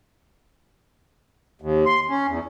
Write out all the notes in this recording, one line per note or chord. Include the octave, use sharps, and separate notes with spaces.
D#2
C6
C#4
E2